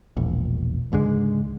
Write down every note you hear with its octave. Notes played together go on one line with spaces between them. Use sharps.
E1 A#1
C#2 G#2 D3 G#3